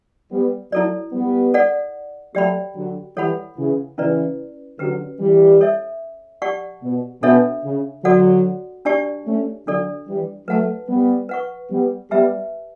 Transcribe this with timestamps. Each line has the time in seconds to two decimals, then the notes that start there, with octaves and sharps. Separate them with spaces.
0.31 G3 B3
0.72 F#3 A3 E4 A4 D5
1.13 G3 B3
1.54 A4 D5 F#5
2.35 F#3 A3 G4 D5 G5 B5
2.76 D3 F#3
3.17 E3 G3 A4 C#5 F#5 B5
3.57 C#3 E3
3.98 C#3 E3 C#4 E4 B4 D5
4.79 D3 F#3 C#4 G4 B4
5.20 E3 G3
5.61 A4 C#5 E5
6.42 G4 D5 F#5 A5 C#6
6.83 B2
7.23 B2 D4 A4 C#5 E5
7.64 C#3
8.04 D3 F#3 F#4 A4 D5 F#5
8.85 D4 G4 D5 A5 C#6
9.26 A3 C#4
9.67 D3 F#3 D4 A4 D5
10.08 E3 G3
10.48 F#3 A3 B4 F#5 A5
10.89 G3 B3
11.29 B4 F#5 C#6
11.71 G3 B3
12.11 G3 B3 G4 B4 E5 A5